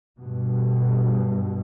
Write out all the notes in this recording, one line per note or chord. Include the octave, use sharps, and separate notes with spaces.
G2 B2